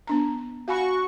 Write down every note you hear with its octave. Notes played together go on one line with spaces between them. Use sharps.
B3 D4 A#5
F#4 F5 G#5 B5 C#6